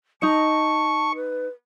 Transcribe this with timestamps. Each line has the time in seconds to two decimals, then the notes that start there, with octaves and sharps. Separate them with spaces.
0.22 D#4 D#5 A5 C#6
1.15 B4